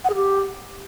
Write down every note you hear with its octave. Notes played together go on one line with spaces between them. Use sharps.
F#5
G#4
G4